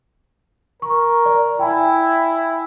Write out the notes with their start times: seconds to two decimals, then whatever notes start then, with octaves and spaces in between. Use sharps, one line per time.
0.82 A#4 C#6
1.26 D5
1.59 E4 G5 G#5